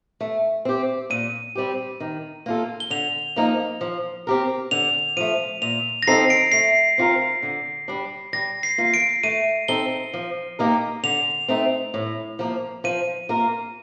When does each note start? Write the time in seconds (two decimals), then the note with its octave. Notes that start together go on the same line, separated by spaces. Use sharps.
0.20 A3
0.65 C4 G4
1.10 A#2 D#7
1.55 G3 C4 G4
2.00 D#3
2.46 A#3 F4 A4
2.80 G7
2.90 D3 F7
3.36 F3 A#3 D#4
3.81 F3
4.27 C4 G4 A#4
4.71 D3 F7
5.17 F3 A3 D#7
5.62 A#2 F7
6.03 A#6
6.07 F3 C4 D#4 A4 C7
6.30 D7
6.52 A3 C7
6.98 C4 F4 A#4
7.43 D3
7.88 G3 D4
8.33 G3 A#6
8.63 C7
8.78 A#3 F4
8.94 D7
9.23 A3 D#7
9.68 C4 D#4 A4 G7
10.13 F3
10.59 A#3 D#4 G4 A#4
11.03 D3 F7
11.48 A3 C4 D#4
11.94 A2
12.39 F3 A#3
12.84 F3 D#7
13.29 A#3 F4 A#4